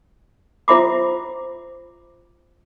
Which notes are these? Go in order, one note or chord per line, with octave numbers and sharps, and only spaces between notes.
F4 C5 E5 B5 D6